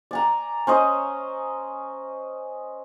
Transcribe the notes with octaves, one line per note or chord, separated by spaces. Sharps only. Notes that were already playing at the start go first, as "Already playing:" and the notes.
D5 G#5 A#5
C#4 C5 D#5